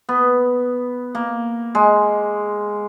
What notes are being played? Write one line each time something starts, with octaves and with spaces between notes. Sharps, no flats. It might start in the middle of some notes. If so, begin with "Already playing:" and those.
B3
A#3
G#3